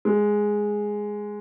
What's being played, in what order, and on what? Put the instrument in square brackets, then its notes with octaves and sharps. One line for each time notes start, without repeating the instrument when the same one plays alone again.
[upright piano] G#3